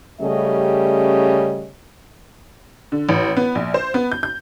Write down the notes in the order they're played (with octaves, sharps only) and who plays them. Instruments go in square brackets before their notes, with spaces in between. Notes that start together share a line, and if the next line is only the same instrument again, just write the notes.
[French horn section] C#3 G3 A3 C#4 G4 D#5
[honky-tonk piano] D3
A1
B3
A#1
C5
B3
G6
G6